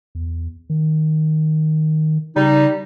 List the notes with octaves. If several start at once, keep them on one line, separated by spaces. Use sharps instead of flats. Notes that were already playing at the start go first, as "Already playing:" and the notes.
E2
D#3
C#3 G3 D#4